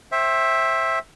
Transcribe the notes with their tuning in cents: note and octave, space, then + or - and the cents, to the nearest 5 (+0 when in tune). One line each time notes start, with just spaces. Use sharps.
C5 +30 E5 +0 G5 +0